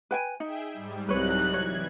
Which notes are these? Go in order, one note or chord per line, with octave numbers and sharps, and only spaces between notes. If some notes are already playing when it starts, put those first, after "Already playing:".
B4 G5 G#5
D#4 G#4 E5 G5
G#2 G3
C2 F#3 G3 D#4 B4 C#5 F#6
E3 C#5 G#6